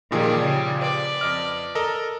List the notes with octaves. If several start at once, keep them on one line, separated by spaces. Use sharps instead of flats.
A#2 D#3 F3 G3 G#4
C#3 G3
B4 D5
F2 D#5 F6
A4 A#4 D#5